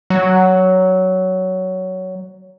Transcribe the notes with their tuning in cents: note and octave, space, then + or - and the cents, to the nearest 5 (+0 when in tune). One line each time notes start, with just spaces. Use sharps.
F#3 +10